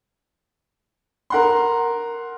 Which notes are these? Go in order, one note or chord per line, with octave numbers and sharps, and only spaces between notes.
A#4 F#5 C6